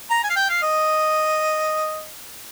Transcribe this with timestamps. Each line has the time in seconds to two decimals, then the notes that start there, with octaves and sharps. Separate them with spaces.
0.10 A#5
0.23 G#5
0.29 F5
0.36 G5
0.50 F5
0.62 D#5